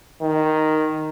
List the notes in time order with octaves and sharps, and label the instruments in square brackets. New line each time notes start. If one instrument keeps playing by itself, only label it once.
[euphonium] D#3